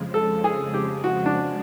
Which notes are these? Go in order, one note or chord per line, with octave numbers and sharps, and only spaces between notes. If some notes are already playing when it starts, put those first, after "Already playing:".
Already playing: F2 C#3 F3 G#3
A4
G#4
G4
F#4
D4